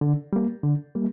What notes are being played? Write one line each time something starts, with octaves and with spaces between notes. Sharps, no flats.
D3
G3 A#3
D3
G3 A#3